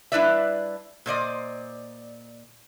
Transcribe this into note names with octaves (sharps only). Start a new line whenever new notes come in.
G3 D4 E4 B4 D5 E5
A#2 C5 D5 D#5